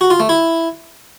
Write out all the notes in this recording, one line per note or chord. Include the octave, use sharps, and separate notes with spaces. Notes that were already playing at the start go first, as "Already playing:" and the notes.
F#4
F4
A3
E4